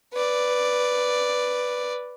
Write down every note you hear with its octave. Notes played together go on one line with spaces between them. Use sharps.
B4 D5